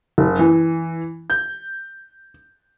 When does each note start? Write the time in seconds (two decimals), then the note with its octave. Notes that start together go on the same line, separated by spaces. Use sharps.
0.18 F#1
0.39 E3
1.30 G6